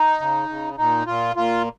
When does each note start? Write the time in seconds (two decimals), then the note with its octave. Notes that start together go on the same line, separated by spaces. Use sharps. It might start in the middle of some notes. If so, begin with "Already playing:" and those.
Already playing: D#4
0.20 C#3
0.49 C#3
0.78 A#2 D#4
1.06 A#2 F4
1.35 A#2 F4